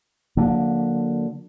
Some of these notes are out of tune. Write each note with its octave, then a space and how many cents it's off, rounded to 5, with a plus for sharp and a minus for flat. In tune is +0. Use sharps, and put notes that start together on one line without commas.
D3 +0 F#3 -40 A#3 +0